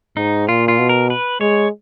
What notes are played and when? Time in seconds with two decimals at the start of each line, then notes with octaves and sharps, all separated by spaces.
0.17 G#2 D#4
0.49 A#2 F4
0.68 F4
0.79 B2
0.89 A#4
1.10 B4
1.41 G#3 C#5